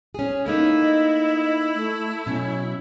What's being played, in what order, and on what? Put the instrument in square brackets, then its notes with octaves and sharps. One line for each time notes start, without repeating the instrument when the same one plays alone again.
[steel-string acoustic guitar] C#4 G#4
[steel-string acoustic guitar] A3 A#3 D#4 [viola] E4
[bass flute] D#5
A3
[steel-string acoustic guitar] B2 F#3 [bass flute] C#4